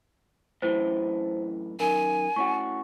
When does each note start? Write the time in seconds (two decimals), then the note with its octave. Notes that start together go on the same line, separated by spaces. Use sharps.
0.62 F#2 A2 E3 C5
1.80 F#2 D#3 A#4 G#5
2.36 A2 C#4 F#4 C#6